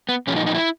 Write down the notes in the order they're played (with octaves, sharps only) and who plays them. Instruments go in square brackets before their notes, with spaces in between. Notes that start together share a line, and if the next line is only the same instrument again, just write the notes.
[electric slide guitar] B3
A#2 F3 C#4
D#4
D#4
E4